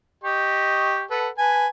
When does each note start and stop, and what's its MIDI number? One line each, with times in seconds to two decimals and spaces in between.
0.24 1.03 67
0.24 1.03 75
0.24 1.03 85
1.11 1.29 69
1.11 1.29 71
1.11 1.29 78
1.38 1.67 71
1.38 1.67 80
1.38 1.67 81